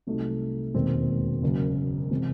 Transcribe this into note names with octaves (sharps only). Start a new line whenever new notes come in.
C2 C3 F#3 A3 D#4
E1 D#2 D#3 G#3 C4
F#1 F#2 C#3
C3 E3 G#3 C4